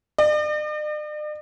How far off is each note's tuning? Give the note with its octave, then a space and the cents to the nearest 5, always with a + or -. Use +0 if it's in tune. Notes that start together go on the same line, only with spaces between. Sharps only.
D5 +45